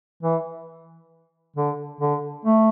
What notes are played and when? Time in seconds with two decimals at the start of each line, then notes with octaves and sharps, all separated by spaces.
0.23 E3
1.57 D3
2.01 D3
2.45 A3